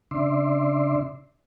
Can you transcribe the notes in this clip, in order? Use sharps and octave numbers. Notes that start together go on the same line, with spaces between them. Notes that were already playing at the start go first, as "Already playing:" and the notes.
C#3 D4 D5 E5 C6